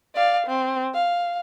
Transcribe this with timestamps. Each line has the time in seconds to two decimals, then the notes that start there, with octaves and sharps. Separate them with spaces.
0.15 D5 F5
0.47 C4
0.94 F5